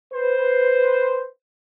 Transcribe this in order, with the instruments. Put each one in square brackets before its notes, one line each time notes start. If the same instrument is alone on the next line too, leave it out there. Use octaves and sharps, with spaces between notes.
[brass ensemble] B4 C5